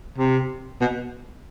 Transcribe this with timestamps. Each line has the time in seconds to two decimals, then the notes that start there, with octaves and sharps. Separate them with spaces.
0.18 C3
0.81 B2